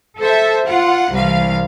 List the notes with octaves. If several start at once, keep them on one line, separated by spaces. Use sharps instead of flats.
A4 C5 E5
F4 F#5
C2 E3 F5